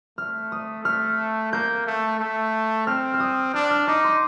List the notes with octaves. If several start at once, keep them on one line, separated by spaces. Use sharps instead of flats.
A3 F6
D#6
A3 F6
A#3 G6
A3
A3
C4 F6
F6
D#6
D4 F6
F6
D#4 D6
C6